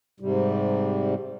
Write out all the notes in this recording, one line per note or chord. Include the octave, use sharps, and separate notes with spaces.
G#2 C3 G3